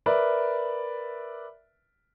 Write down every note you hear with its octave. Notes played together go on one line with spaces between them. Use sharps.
A#4 B4 D5 E5